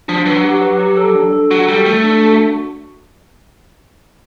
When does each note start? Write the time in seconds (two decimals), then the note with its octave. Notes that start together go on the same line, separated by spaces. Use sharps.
0.08 F3 D4
0.26 F#3 B4
0.44 G4
0.62 B4
0.80 G4
0.97 A4
1.15 D4
1.33 A4
1.51 F#3 F#4
1.68 G3 A4
1.86 A3 A4
2.04 D4
2.22 F#4